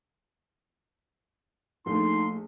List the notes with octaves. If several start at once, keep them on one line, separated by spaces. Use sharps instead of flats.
A#1 A3 D#4 C6